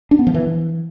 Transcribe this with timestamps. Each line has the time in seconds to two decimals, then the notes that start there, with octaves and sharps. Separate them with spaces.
0.11 D4
0.19 B3
0.27 F3
0.34 E3